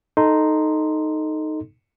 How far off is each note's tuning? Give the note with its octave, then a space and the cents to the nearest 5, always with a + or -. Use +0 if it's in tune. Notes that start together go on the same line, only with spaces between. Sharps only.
D#4 +0 A4 +0 C6 -5